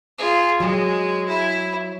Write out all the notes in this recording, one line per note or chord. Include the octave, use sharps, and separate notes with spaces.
F4 G#4
F#3 G#3
E4